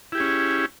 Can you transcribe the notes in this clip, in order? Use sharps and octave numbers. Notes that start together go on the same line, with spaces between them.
C#4 E4 G4 G#4